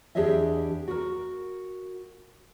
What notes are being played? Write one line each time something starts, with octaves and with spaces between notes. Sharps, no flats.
E2 D4 G4 G#4 D#5 E5
F#4 A#4